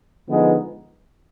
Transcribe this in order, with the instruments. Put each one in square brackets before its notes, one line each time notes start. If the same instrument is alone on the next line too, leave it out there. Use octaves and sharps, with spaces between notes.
[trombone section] D3 F3 G#3 B3 D#4